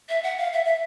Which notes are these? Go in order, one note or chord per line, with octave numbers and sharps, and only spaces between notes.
E5
F#5
F5
E5
E5